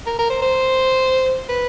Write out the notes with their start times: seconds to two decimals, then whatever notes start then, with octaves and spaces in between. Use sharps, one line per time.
0.06 A#4
0.19 A#4
0.30 C5
0.42 C5
1.49 B4